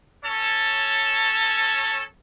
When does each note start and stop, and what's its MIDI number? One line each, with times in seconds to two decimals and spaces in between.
0.25 2.02 61
0.25 2.02 69
0.25 2.02 73
0.25 2.02 81